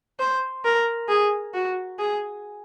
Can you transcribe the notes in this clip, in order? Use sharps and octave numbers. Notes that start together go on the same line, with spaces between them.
C5
A#4
G#4
F#4
G#4